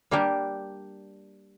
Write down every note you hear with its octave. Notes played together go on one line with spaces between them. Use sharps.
G3 A#3 D4 G4 A#4